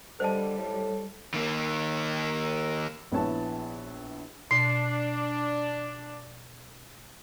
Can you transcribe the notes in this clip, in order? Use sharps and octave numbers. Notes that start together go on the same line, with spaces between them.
D3 G3 A4 C5 D#5 A5
A2
D#3 A#3
A#1 B3 E4 C#5 A5
B2 D4 C7